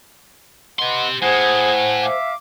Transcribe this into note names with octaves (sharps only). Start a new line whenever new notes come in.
G4 B4 D#5 F#5 C6
A2 G#4 C5 F#5 G#5 D#6 G#6
E5 F5 D6